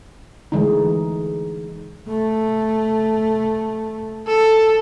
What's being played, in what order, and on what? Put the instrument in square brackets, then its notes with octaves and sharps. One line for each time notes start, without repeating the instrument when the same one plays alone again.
[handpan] D3 E3 G#3 A3 D#4
[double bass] A3
[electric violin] A4